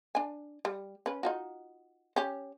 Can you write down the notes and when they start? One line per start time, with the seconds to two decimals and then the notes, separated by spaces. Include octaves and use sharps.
0.15 D4 G#5
0.65 G3
1.06 C#4 B4
1.23 D#4 F4 F#4
2.16 C#4 G4